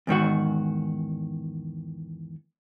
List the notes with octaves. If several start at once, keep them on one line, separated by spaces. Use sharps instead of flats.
E2 G#2 D#3 F#4